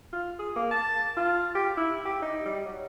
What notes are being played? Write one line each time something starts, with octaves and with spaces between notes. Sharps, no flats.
F4
G#4
A#3
A5
F4
G4
E4
G4
D#4
G3
F#3